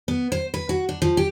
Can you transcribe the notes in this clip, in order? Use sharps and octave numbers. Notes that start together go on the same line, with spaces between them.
B3
C5
B4
F#4
D4
F3
G4